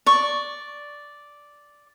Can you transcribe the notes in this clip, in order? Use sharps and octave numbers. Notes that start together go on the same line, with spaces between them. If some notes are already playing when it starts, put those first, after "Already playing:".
D5 C#6